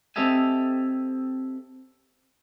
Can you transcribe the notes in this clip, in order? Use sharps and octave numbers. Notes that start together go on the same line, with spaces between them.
C4 G4 A4 D#5 E5 G#5